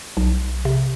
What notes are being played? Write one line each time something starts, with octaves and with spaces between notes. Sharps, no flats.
B1
C3